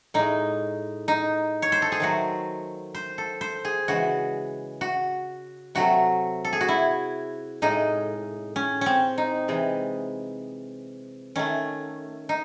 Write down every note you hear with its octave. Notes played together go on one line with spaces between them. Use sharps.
A2 G#3 D#4
D#4
C#5
C5
A4
G#4
D#3 F#3 A3 F#4
C5
A4
C5
G#4
C#3 E3 G#3 F#4
F#4
C3 F#3 A3 F#4
A4
G#4
F#4
E4
A2 G#3 D#4
C#4
C4 C#4
D#4
C3 E3 G#3
D#3 A3 C#4
D#4